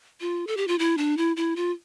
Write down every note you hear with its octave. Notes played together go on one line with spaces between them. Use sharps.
F4
A4
G4
F4
E4
D4
E4
E4
F4